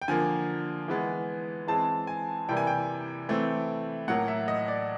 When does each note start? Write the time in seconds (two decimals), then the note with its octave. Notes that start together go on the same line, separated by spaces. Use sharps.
0.02 G5
0.08 D3 F3 A#3 G#5
0.88 E3 G#3 B3
1.67 E3 G#3 C4 A5
2.07 G#5
2.49 C3 E3 G3 A#3 G5
2.57 G#5
2.67 G5
3.29 E3 A3 C4
4.08 A2 F#3 A#3 F#5
4.28 E5
4.48 D#5
4.68 D5